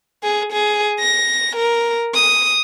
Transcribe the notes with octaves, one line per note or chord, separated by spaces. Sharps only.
G#4
G#4
A#6
A#4
D#6